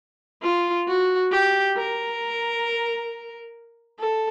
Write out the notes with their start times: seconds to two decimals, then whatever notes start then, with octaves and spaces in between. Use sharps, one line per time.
0.43 F4
0.88 F#4
1.32 G4
1.77 A#4
4.00 A4